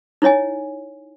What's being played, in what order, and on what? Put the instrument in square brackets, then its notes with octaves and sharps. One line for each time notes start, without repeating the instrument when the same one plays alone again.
[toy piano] D#4 E4 C#5 D#5 G#5